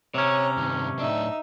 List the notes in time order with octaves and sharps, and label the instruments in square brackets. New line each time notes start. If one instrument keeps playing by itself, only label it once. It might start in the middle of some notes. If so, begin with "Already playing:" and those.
[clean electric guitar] C3 C#4 [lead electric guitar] C#5 [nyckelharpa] A#5
[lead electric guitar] G2 D#3
[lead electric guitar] A2 D4 [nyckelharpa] D#4 E5